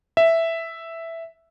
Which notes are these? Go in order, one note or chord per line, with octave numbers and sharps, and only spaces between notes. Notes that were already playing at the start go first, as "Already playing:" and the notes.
E5